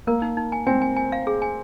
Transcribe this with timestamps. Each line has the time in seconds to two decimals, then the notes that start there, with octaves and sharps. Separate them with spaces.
0.07 A#3 A#4
0.22 D#4
0.37 D#4
0.52 G#5
0.67 C4 G#5
0.82 G#5
0.96 G#5
1.12 F5
1.27 G#4
1.42 G#5